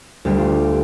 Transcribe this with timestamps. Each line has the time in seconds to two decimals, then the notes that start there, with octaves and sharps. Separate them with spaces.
0.25 D2 D3 G3 G4
0.38 F4
0.62 G4